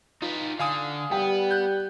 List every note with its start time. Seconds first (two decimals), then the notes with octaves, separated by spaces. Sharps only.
0.22 D#4 F4 B4
0.59 D3 F5 G#5 D#6
1.11 G3 B3 G5
1.51 F#6 G6